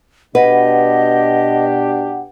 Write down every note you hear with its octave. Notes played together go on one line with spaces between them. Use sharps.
B2 D4 G4 B4 D#5 F#5